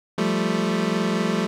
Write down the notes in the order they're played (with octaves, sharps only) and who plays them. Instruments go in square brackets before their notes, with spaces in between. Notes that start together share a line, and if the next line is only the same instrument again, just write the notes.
[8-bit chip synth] F3 G3 A3